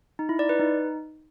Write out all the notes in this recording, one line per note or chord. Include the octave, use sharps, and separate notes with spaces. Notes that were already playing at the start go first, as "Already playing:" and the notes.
D#4
E4
D5
B4
D#4